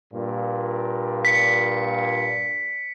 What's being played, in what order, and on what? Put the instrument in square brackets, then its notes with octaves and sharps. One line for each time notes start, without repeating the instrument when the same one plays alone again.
[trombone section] G2 A#2
[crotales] B6 C#7